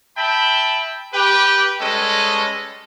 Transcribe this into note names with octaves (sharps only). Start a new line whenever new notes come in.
E5 G5 A5 B5
G4 B4 G5
G3 G#3 C#4 A4 B4 D#5